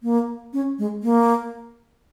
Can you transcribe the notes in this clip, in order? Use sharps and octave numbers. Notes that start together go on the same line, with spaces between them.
A#3
C#4
G#3
A#3